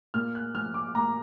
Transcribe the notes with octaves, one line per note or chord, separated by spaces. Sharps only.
A#2 F6
F#6
F3 F6
D6
A#2 A#5